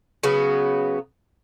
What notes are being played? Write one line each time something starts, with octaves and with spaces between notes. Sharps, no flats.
C#3 F#3 B3